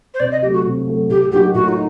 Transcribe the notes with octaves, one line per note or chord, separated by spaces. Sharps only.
C5
C3 D5
D#5
F#3 A3 G4
F#4
C3
F#3 A3
A2 G4
F#3 A#3 D#4 F#4 G4
A2 F#4
D#4